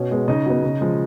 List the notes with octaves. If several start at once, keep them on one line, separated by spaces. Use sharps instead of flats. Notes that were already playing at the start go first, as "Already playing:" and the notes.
Already playing: B2 C#4 C#5
G#3 B3
C#3 D#4 D#5
F#3 B3
C#3
F3 G#3